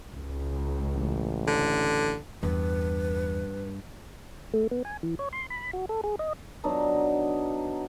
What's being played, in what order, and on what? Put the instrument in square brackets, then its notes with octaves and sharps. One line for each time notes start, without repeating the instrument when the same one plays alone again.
[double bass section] C#2
[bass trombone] A1
[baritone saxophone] D3
[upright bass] E2 [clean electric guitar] G2 [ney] B4
[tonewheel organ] A3
B3
G#5
E3
C#5
C6
B5
F#4
A4
G#4
D#5
[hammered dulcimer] F#3 B3 D4 D#4